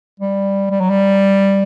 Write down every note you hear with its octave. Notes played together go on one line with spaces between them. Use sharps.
G3
G3
F#3
G3